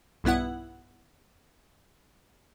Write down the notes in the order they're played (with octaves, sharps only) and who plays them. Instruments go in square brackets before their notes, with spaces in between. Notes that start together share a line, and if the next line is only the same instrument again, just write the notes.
[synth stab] B1 G2 B3 E4 F#5